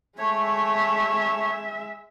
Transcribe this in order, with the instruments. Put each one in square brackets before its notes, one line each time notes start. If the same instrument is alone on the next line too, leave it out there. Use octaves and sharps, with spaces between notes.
[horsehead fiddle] G#3 E5 [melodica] A3 C#5